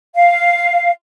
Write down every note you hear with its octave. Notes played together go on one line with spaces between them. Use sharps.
F5